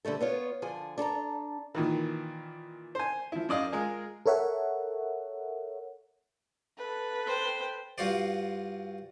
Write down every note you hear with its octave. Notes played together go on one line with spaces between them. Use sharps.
D3 G3 A3 A4
B3 F4 C#5
D3 F3 G#4 G#5
D4 A4 A5 A#5
A#2 D#3 E3
C5 G#5
F3 E4
F#2 D5 D#5 F5
G#3 F4 G#4 A#4
A4 A#4 C#5 E5 F#5
A4 B4
C5 G5
G2 F4 F#4 C5 D5